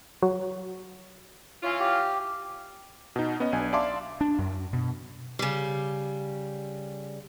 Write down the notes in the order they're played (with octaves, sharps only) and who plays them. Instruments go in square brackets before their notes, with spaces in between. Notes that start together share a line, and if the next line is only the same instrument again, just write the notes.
[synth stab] F#3
[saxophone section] E3 C#4 F4
[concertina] G4
[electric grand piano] B2 D#4
B3 C#4 D#5
B1 D4 G#5
D5 E5 F5 A5 C6 D6
[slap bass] D4
F#2
B2
[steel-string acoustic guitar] C#3 G3